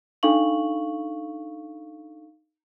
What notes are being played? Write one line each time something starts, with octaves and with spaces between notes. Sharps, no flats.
D4 D#4 A4 F5 C#6 F#7